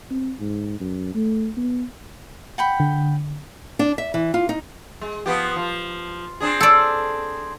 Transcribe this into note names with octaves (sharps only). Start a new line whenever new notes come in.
C4
G#2
F#2
A3
B3
F#5 G5 B5
D3
D4
E5
E3
F4
D#4
G#3
F3 B3 G4
F3
C4 D4 G#4
A4 D5